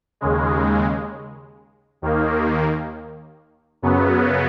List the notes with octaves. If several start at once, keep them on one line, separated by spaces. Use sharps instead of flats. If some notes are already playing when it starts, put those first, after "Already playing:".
D#2 C#3 G#3
D#2 D#3 A#3
F#2 C#3 F#3 B3